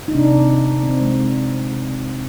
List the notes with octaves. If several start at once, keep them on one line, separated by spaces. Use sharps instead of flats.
D#4
C3 D4
C3
C3
C4
C4
G#3